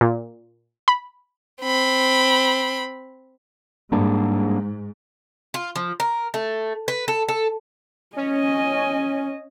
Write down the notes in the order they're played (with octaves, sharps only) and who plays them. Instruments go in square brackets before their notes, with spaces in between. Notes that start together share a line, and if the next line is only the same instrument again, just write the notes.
[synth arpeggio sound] A#2
B5
[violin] C4 B5
[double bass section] G#2 [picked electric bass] G3 A#3 D4
[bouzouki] F4
F3
A#4
A3
B4
A4
A4
[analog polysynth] C#4 [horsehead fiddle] D#5 G#5